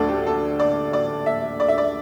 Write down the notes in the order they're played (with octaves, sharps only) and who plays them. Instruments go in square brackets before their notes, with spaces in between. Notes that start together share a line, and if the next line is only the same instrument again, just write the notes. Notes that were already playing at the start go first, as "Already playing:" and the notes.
Already playing: [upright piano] D2 D3 A3 A4 D5
G4
A4
D5
D5
E5
D5
E5
D5